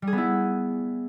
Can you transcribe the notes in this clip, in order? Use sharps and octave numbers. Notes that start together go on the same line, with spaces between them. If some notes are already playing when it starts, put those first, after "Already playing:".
G3
G#4
B3
E4